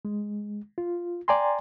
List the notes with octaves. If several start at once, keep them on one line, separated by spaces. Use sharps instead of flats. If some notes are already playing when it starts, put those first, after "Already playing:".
G#3
F4
D5 G5 G#5 A#5 C6